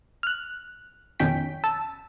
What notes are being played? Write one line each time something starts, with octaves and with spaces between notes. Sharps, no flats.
F6 F#6
F2 B2 D#3 C#4 G5 B6
A5 E6